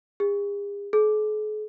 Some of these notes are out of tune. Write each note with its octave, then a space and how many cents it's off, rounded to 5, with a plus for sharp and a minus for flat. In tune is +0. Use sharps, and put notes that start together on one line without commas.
G#4 -45
G#4 +45